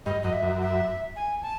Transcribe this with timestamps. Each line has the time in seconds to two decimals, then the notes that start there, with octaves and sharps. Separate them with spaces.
0.06 G2 D#5
0.22 F#2 D#5
0.33 E5
0.43 F#2
0.62 E5
1.16 G#5
1.42 A5